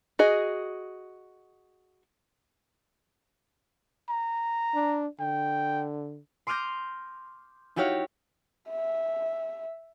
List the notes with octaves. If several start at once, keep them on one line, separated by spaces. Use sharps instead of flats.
F#4 G#4 D#5
A#5
D4
D3 G5
C6 D6 D#6 F6 G6 A#6
D#4 E4 F#4 G4 C#5 F5
E5